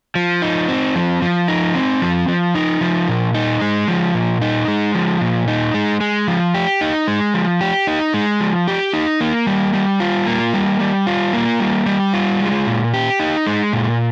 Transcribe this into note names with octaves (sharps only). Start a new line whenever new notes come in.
F3
D#4
C4
F3
F3
D#4
C4
F3
F3
D#4
F3
A#2
D#4
G#3
F3
A#2
D#4
G#3
F3
A#2
D#4
G#3
G#3
F3
G4
D#4
G#3
F3
G4
D#4
G#3
F3
G4
D#4
A#3
G3
G3
F4
A#3
G3
G3
F4
A#3
G3
G3
F4
G#3
A#2
G4
D#4
G#3
A#2